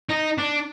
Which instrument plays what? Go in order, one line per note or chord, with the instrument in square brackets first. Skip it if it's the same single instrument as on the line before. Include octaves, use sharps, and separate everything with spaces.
[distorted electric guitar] D#4
D4